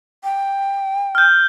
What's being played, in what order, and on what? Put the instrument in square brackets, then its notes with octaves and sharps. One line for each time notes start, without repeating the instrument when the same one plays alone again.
[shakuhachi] G5
[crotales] F6 G6